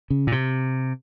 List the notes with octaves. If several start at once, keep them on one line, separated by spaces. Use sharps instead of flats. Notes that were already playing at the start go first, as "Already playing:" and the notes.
C#3
A#2
C3